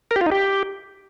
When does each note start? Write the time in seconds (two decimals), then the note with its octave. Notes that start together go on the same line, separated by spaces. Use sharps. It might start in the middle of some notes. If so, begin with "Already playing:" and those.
0.11 A#4
0.16 G4
0.21 F4
0.26 D#4
0.31 G4